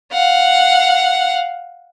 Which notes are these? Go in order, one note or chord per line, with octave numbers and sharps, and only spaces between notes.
F5 F#5